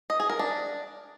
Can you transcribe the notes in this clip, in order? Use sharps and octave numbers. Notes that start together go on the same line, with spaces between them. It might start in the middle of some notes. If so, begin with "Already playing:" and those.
D#5
G#4
A#4
D4